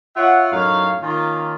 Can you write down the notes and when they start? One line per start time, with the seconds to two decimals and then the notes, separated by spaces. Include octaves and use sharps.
0.16 F4 C#5 E5 F#5
0.52 F#2 A2 D#4 C#5 F5
1.02 D#3 A#3 C#4 F4